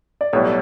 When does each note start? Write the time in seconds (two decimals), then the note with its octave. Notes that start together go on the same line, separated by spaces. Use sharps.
0.21 D5
0.33 B1 A2 G3 B3 C#5